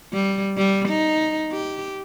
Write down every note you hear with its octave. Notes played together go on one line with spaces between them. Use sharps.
G3
G3
D#4
G4